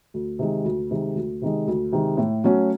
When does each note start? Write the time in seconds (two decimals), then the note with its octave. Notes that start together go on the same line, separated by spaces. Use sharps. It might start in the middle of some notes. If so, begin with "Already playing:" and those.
0.14 D2
0.39 C3 D#3 G#3
0.64 D2
0.91 C3 D#3 G#3
1.15 D2
1.41 C3 D#3 G#3
1.68 D2
1.92 C3 D#3 G#3
2.17 A2
2.44 F#3 A3 C#4 F#4